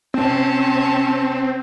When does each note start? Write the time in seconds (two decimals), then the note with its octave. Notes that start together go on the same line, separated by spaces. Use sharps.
0.14 C3 C4 C#4 A5